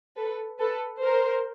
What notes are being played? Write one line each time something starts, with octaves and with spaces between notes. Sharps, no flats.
A4 B4
A4 B4
A#4 C5